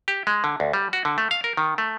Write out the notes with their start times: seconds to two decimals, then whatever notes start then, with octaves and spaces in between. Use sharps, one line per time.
0.08 G4
0.27 G#3
0.44 D3
0.60 D2
0.73 G3
0.93 F#4
1.05 D3
1.18 A3
1.31 F5
1.44 A#4
1.57 D#3
1.78 A3